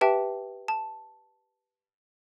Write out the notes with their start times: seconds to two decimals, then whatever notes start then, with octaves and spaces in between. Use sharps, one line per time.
0.01 G4 B4 E5 G5 A5
0.68 A5